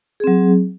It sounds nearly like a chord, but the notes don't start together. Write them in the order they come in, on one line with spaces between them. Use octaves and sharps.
G#4 C4 F#3